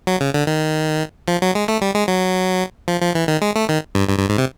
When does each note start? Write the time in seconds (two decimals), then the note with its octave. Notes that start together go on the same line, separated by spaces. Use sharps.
0.07 F#3
0.21 C#3
0.34 D3
0.47 D#3
1.28 F3
1.42 F#3
1.55 G#3
1.68 A3
1.81 G3
1.95 G#3
2.08 F#3
2.88 F3
3.02 F3
3.15 E3
3.28 D#3
3.42 G#3
3.56 A3
3.69 D#3
3.95 G2
4.08 G2
4.19 G2
4.29 G#2
4.38 C3